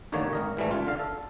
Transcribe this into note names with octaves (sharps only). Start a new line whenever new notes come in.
A1 D#2 D3 D#3 A#3 C#5
G#1 A#4 D#5
G#2 E3 G3 A3
C#2 F4
D3 F5
A4